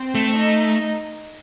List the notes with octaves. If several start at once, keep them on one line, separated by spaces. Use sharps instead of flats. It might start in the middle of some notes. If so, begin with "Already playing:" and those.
Already playing: C4 C5
A3
D#4 D#5